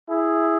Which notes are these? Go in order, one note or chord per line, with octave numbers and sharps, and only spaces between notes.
E4 G#4